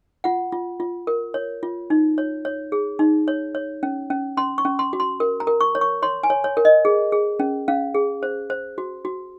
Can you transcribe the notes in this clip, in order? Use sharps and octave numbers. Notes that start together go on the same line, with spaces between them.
F4 F#5
F4
F4
A#4
C#5
F4
D#4
C#5
C#5
G#4
D#4
C#5
C#5
C#4
C#4
C#4 C6
C#6
C#4
C6
F#4
C6
A#4
A#5
A#4
C#6
C#5
C#6
C#5 C6
G#5
C#5
C#5
A#4
D#5
G#4
G#4
C#4
C#4 F5
G#4
C5
C5
F#4
F#4